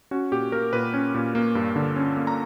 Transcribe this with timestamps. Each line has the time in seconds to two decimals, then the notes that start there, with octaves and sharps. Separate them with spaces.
0.11 C#4 F#4
0.32 A#2 G4
0.52 A#3 A#4
0.73 A#2 B4
0.94 C#4
1.14 A#2
1.35 A#3
1.55 G2
1.76 D3
1.96 C#4
2.17 A#3
2.27 A#5